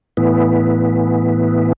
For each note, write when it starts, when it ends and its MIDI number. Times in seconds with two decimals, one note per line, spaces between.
0.17 1.73 45
0.17 1.73 52
0.17 1.73 59